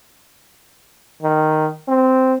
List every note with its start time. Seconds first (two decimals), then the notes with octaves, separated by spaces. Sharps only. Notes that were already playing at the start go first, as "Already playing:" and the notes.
1.22 D#3
1.88 C4